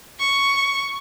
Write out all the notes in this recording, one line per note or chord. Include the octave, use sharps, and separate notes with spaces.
C#6